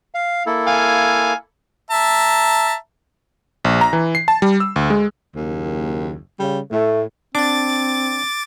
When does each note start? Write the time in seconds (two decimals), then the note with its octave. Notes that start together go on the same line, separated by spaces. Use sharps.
0.15 F5
0.47 A#3 E4 A4
0.67 F5 G#5
1.91 E5 A5 A#5
3.65 A#1
3.81 A#5
3.93 E3
4.15 C7
4.28 A5
4.42 G3
4.60 E6
4.76 D2
4.90 G#3
5.35 F#1 D#2
6.39 C#3 G3
6.72 A2 A3
7.35 C4 D4 D6 A6